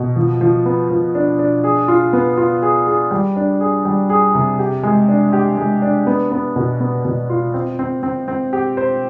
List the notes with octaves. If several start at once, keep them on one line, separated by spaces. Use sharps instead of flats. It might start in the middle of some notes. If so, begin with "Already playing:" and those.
Already playing: B2
F3
F3
B3
F3
D4
D4
G#4
F4
B3
F4
G#4
G#4
G3
D4
G#4
G3
G#4
C3
G4
G#3
D4
G4
G#3
D4
B3
B3
B2
B3
B2
F4
C4
C4
C4
C4
G4
C5